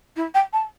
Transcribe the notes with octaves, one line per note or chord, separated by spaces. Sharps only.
E4
G5
A5